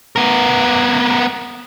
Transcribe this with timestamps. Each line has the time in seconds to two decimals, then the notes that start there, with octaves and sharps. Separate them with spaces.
0.16 B3 A#4